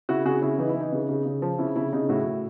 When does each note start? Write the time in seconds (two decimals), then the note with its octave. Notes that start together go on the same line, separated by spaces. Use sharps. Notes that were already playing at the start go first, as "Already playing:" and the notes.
0.09 C#3 E4 F#4
0.25 C#3 F#4 G#4
0.42 C#3 E4
0.58 E3 D#4
0.69 E4
0.75 E3
0.80 D#4
0.92 C#3
1.09 C#3
1.26 C#3
1.42 F3
1.59 C#3 E4
1.76 C#3 E4
1.93 C#3 D#4
2.09 A2 E4 F#4
2.26 A2